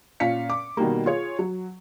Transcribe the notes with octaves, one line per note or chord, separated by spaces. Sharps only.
A#2 C#4 F5 B6 C#7
D6
B2 D#3 G3 A#3
F4 G#4 C#5
F#3